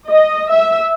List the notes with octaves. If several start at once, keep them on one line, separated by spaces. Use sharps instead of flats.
D#5
E5